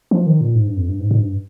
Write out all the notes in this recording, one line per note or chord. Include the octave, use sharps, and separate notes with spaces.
F3
D#3
A#2
G#2
G2
F2
G2
G#2
G#2
G2